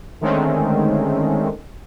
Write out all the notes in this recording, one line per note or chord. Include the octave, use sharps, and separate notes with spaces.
D3 D#3 G#3 A3 C4 C#4